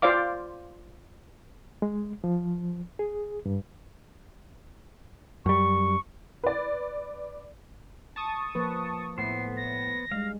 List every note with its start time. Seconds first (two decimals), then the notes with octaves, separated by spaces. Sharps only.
0.02 F4 C5 D5 F5 D6
1.82 G#3
2.24 F3
2.99 G#4
3.46 G2
5.46 F#2 G3 C#6
6.43 B4 D5
8.16 A5 C#6 D#6
8.55 F3 A#3 B4
9.18 A2 B3 C5 C7
9.57 A#6
10.12 G3 G#3 F5